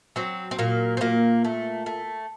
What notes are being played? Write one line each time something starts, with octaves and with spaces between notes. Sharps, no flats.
F#3 C4
C4
A#2 A#3
C4
A#2 A#3
A3
A3